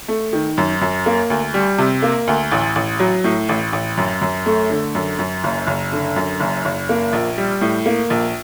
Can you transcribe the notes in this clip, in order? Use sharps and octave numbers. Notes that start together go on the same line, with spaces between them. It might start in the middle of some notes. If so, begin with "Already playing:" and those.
A3
D#3
F#2
F#2
A#3
D2
G3
C3
A#3
D2
A1
A1
F#3
A2
A1
A1
F#2
F#2
A3
D3
F#2
F#2
F#1
F#1
D3
F#2
F#1
F#1
A#3
A#1
G3
A2
A#3
A#1